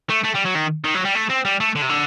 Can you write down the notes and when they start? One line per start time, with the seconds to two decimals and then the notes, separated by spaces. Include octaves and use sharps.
0.09 A3
0.24 A3
0.34 G3
0.45 F#3
0.54 D#3
0.84 D#3
0.95 F#3
1.05 G3
1.15 A3
1.30 C4
1.45 G3
1.60 A3
1.76 D3
1.82 C3
1.90 D3